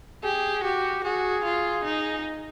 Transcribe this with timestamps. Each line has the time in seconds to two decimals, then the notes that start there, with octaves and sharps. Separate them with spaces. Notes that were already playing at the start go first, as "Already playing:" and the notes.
0.23 G4 G#4
0.64 F#4 G4
1.04 F#4 G#4
1.44 F4
1.85 D#4